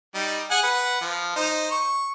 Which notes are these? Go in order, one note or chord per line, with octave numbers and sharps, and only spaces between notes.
G3 D#4
G#4 F#5 G#5
B4 F#5
F3
D#4 C5
C#6